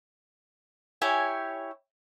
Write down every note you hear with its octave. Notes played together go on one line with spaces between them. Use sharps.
E4 G4 C#5 G#5